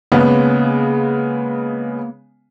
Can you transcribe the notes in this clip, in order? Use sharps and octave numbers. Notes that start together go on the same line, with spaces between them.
C#3 G#3 A#3 B3